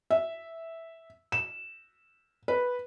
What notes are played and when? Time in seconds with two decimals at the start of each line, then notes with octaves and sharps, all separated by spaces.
0.11 E5
1.32 E7
2.48 B4